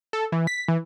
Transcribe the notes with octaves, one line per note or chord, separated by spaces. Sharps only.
A4
E3
B6
E3